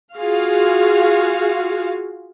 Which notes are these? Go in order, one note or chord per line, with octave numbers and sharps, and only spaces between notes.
F4 F#4 G#4 F5